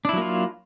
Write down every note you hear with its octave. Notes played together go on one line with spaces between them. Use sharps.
F#3 A#3 D4 E4 F4